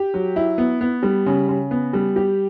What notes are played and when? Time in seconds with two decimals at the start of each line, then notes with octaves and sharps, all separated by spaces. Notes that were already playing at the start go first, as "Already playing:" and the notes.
Already playing: G4
0.14 F#3
0.36 E4
0.58 B3
0.81 B3
1.03 G3
1.26 C#3
1.49 C#3
1.71 B3
1.93 G3
2.16 G4